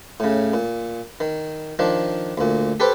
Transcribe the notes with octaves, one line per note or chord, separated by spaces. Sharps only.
A2 C#3
A#2
D#3
D#3 F3 D4
D2 A#2
G4 A4 B4 C5 G5